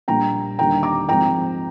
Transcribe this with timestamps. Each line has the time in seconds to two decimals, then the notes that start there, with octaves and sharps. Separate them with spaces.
0.08 A#1 A#2 G3 A#3 G5 A#5
0.58 D#2 D3 G3 A#3 D4 G5 A#5
0.83 A#5 D6
1.09 G#2 F3 G#3 C4 G5 A#5